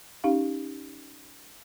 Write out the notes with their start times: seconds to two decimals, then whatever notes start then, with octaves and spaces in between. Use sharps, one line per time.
0.24 C#4 D#4 G4 F5